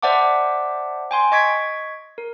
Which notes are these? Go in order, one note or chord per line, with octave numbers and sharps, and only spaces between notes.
C5 D5 E5 F#5 A5 D6
G5 G#5 C6
D#5 C#6 G#6 B6 D7
A#4